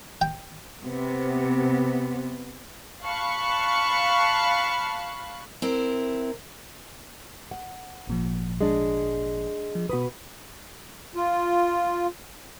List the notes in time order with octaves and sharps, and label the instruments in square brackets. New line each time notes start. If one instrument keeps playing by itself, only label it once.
[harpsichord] G5
[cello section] C3 B3
[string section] F5 A5 B5 C#6 F#6
[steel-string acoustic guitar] C4 E4 A#4
[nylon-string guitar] F#5
[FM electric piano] G#1 A#2 F3
[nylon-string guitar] G#3 D4
[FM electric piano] F3
[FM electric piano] B2 B5 D#6 [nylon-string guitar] F#4 B4
[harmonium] F4